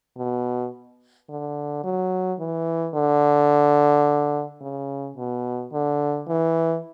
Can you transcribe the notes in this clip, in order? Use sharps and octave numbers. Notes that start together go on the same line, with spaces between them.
B2
D3
F#3
E3
D3
C#3
B2
D3
E3